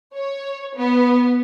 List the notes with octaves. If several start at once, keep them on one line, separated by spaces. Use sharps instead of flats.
C#5
B3